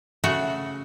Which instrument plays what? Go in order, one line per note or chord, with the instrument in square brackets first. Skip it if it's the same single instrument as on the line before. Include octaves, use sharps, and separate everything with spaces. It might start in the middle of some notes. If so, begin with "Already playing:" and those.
[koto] C#3 A3 F#4